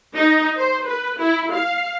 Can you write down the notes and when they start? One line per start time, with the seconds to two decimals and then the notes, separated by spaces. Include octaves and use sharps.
0.16 D#4
0.58 C5
0.87 B4
1.20 E4
1.54 F5